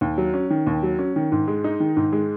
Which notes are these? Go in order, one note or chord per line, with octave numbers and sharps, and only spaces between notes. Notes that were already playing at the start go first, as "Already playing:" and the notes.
D#2
F#3
C#4
D#3
D#2
F#3
C#4
D#3
G#2
G#3
D#4
D#3
G#2
G#3